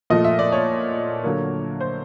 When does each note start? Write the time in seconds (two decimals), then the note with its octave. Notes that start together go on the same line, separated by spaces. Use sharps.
0.10 A#2 F3 A3 D#5
0.24 E5
0.39 D5
0.52 C#5
1.24 D3 F#3 A#3
1.80 C5